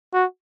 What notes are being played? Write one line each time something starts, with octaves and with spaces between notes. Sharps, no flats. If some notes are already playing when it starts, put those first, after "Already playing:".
F#4